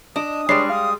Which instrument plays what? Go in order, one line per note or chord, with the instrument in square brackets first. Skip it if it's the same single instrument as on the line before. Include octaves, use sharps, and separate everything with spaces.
[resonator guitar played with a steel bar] D4 [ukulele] D#5 [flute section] D#6
[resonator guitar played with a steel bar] G3 G#3 [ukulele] D4 B4 C#5 [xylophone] C7
[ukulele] F5 [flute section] D#6